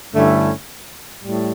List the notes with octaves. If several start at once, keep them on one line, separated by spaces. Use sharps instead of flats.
G2 D3 A3 C#4 E4
A2 G3